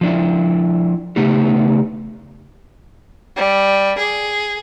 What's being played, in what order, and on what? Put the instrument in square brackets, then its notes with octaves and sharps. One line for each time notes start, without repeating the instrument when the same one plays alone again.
[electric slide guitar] F3 D4 E4
C#3 A3 B3 D#4 G4
[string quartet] G3
G#4